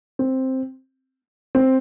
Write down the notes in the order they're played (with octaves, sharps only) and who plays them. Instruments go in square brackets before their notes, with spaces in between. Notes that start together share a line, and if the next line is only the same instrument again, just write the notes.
[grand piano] C4
C4